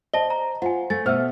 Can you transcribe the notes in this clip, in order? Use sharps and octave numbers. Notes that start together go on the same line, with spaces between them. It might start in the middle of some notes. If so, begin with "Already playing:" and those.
C5 D#5 A5 A#6 G7
A#5
F4 C5 F#5 G#5
A3 G#5 A6
B2 C5 E5 E6 F6